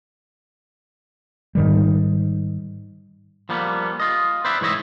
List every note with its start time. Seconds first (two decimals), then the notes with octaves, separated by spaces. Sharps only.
1.55 G#2 D#3 G3
3.49 F3 G3 A#3 B3
4.00 F4 D#5
4.45 B4 C5 D5 E5
4.61 G#2 E3 C#5 D#5 E5